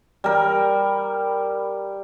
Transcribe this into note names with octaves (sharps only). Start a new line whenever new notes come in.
G3 A#4